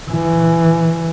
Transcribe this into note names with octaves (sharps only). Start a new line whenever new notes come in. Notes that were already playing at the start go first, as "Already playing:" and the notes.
E3